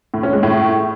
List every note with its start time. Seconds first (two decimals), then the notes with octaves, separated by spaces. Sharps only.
0.14 A2
0.23 C#4
0.33 G#3
0.43 A2